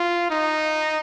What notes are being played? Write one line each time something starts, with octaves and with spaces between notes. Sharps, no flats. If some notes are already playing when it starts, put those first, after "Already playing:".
Already playing: F4
D#4